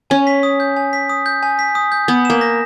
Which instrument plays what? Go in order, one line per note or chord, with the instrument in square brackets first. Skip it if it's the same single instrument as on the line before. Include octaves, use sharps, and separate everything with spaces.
[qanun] C#4 [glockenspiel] G#5
[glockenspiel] B6
D#6
G6
G#5
B6
D#6
G6
G#5
B6
D#6
G6
[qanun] B3 [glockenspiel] D#6
[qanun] A#3 [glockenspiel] E7
[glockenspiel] A#6